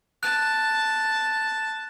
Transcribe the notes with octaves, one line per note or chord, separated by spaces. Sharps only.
A5 F#6